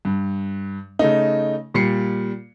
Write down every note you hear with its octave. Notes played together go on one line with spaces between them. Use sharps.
G2
C#3 A3 D#4
A#2 G3 C7 C#7